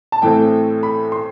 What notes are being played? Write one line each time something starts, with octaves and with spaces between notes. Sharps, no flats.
A5
A2 E3 A3 C4 G5
B5
C6